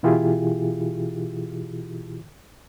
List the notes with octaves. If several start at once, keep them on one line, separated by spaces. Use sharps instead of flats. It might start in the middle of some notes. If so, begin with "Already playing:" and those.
B2 E3 E4 F4 G4 G#4